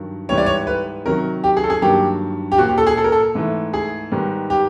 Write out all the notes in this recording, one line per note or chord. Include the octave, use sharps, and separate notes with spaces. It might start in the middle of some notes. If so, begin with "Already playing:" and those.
Already playing: G2 D#3 F#3
G#2 E3 G3 B3 C#5
D5
C#5
B4
C3 D#3 F#3 A#4
G4
G#4
A4
G#4
G2 D#3 F#3 A#3 G4
G4
A#2 F3 A#3 F#4
G4
A4
G#4
A4
A#4
A4
G#2 E3 A3
G#4
G#2 D#3 G3 B3
G4